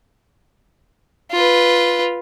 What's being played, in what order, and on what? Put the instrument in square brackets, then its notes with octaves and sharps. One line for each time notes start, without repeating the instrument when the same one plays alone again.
[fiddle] F4 B4